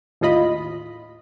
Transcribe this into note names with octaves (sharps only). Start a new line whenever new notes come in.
D#2 A2 F4 D#5 B5